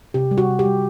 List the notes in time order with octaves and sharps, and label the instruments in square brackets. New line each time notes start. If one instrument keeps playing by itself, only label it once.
[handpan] C3 G4
G3
F#4
C3
G4
G3